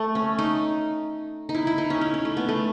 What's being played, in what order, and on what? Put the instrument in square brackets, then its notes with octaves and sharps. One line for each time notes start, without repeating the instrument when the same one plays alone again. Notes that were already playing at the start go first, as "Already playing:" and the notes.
Already playing: [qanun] A3
C#4
D#4
D#4
E4
E4
D#4
C#4
C#4
C#4
A3
B3
A3